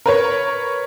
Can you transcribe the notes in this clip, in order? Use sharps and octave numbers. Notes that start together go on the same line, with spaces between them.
A#4 B4 C#5